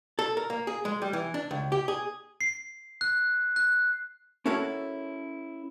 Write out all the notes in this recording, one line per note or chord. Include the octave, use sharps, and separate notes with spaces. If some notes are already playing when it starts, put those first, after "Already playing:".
A4
A#4
A#3
G#4
G#3
G3
E3
D4
C#2
G4
G#4
C7
F#6
F#6
C#4 E4 F#4 A4 A#4 C#5